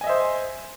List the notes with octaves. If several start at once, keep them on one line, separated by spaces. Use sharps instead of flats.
C5 D#5 E5 G#5